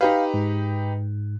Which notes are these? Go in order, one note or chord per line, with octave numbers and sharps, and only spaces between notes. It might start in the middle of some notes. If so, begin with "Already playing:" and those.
D#4 G4 B4 F5
G#2